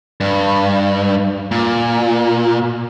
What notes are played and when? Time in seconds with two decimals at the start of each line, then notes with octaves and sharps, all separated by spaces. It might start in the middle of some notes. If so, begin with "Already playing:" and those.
0.20 G2
1.51 A#2